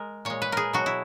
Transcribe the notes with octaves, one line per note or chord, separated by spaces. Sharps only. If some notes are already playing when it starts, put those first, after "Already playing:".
Already playing: G#3 A#4
A#2 G#3 C#5
B4
G#4 A#4
B2 F#3 F#4
E4